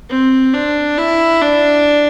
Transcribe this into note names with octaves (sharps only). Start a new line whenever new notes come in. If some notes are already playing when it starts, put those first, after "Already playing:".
C4
D4
E4
D4